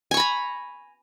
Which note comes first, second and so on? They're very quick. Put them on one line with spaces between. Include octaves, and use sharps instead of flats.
G#5 C#6 B5 A#5